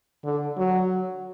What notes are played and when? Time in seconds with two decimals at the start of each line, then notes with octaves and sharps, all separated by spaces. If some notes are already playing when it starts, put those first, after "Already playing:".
0.25 D3
0.58 F#3